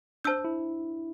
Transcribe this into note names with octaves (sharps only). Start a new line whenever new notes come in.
D4 C5 A5 E6 G6
E4